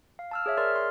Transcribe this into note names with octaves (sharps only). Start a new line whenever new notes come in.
F5
A5 E6 F6
G#4 C#5 E5
G#4 A#4 D5 C6 F6
C6